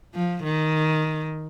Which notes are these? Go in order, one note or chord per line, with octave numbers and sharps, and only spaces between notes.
F3
D#3